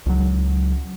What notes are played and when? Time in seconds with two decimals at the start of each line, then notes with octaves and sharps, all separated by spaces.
0.06 C#2 F#3